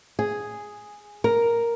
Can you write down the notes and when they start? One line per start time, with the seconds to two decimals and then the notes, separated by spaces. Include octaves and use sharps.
0.19 G#4
1.24 A#4